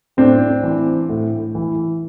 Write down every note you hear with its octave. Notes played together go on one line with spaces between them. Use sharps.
A2 C4 D4
E3
A2
E3